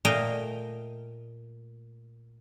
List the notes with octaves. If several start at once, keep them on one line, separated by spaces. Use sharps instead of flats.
A#2 A3 D#5 F5 G5 A#5